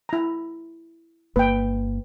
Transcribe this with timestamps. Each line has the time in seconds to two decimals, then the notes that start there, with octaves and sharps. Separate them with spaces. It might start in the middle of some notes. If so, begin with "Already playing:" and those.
0.09 E4 A#5
1.36 G1 A#3 B4 G5